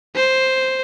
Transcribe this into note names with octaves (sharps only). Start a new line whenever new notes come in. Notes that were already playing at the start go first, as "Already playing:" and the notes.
C5